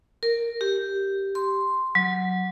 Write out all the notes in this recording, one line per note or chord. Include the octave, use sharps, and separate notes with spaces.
A#4
G4
C6
F#3